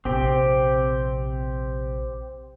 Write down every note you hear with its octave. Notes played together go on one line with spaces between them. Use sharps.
A#1 C3 C4 G4